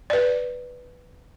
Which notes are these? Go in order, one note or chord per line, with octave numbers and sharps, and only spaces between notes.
B4 D5